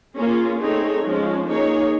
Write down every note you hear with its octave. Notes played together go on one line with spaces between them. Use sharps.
A#3 C#4 F4 G#4
A3 C4 D#4 G#4 C#5
F3 G#3 C#4
A#3 D#4 G#4 C#5